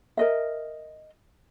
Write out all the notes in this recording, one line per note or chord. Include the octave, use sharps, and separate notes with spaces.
A#4 D#5 E5